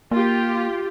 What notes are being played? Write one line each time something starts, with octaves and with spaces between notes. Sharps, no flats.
A#3 F4 G4